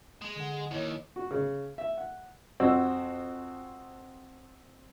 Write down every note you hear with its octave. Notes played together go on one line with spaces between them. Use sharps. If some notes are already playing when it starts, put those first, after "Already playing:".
G#3
D3 F#5
D#2 E4 C#5 D#5
F#4
C#3
E5
F#5
F2 C4 F#4 E6